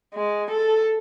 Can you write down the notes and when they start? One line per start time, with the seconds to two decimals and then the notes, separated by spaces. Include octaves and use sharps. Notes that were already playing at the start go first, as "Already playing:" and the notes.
0.15 G#3
0.51 A4